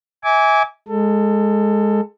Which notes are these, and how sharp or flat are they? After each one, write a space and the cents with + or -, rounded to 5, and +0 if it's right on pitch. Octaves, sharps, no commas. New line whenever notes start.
E5 -35 G#5 -5 D6 -25
G#3 +0 A4 +20